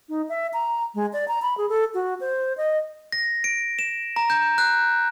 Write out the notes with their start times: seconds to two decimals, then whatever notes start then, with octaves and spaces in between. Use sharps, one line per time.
0.09 D#4
0.29 E5
0.53 A#5
0.95 G#3
1.13 D5
1.28 A#5
1.42 B5
1.57 G#4
1.69 A4
1.94 F#4
2.20 C5
2.57 D#5
3.12 A#6
3.44 D7
3.79 E7
4.16 A#5
4.30 G6
4.58 F#6